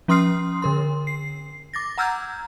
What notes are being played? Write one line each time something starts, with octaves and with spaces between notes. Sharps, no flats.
F3 C#4 C6 D#6 F6 C7
D3 A#4 C6
C7
D6 A6 A#6
F#5 A#5 E6 F6 G6 G#6